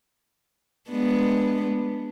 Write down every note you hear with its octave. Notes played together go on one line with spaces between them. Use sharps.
G#3 B3 D4